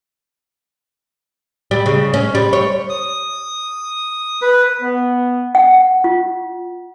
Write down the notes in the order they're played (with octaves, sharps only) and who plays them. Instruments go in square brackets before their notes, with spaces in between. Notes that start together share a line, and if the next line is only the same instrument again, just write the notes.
[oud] G3
C#3
C#4
G3
C#5
[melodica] D#6
B4
[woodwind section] B3
[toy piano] F#5
F4